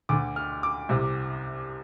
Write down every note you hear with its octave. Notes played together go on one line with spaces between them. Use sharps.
D2 D3 D6
F6
D6
C2 C3